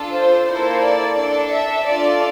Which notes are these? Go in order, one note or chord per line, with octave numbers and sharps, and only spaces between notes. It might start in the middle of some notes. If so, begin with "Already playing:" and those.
Already playing: D4 F4 A4
C5
A#3 E4 A4 C5
D5
D4 A4 D5
E5
D4 F4 A4 D5